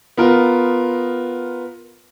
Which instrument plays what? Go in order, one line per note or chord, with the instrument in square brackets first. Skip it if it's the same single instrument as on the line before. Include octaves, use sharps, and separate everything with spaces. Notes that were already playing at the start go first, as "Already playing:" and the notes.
[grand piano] B3 F4 A#4